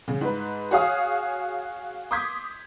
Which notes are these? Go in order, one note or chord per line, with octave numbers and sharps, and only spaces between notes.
C#3
G#2 B4
F#4 G#4 C#5 F5 G#5 D#6
C6 D6 D#6 G6 G#6 B6